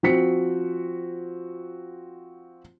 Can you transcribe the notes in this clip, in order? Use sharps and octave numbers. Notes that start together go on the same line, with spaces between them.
F3 C4 F#4 B6 C#7